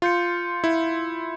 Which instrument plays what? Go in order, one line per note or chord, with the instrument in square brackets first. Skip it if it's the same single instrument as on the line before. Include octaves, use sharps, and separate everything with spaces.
[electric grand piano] F4 [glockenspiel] C6 G6 C#7
[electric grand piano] E4